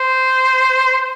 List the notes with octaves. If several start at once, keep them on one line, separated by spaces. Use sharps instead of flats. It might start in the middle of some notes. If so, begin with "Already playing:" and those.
Already playing: C5